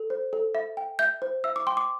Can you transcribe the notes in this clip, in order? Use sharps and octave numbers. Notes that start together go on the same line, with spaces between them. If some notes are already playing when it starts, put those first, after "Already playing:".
Already playing: A4
C5
A4
E5
G5
E5 G6
C5
E5 E6
D6
G5 C6
D6